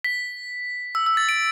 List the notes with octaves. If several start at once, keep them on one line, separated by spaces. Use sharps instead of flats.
B6
E6
E6
A6
D7